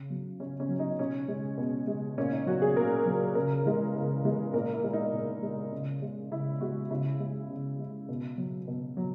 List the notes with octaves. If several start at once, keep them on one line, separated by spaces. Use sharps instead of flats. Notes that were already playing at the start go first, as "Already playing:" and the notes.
Already playing: C#3
F#3
C#3 C#4
C#4
F#3
D#4
B2 C#4
G#3
B2
G#3
A#2 C#4
D#4
F#3 F#4
G#4
A#2 A#4
F#3
C#3 A#4
E3 G#3
C#3
E3 G#3
A#2 A#4
E4
G#3
D#4
A#2
G#3
C#3
G#3
C#3 E4
G#3 F#4
C#3 E4
G#3
C#3
G#3
B2
F#3
B2
F#3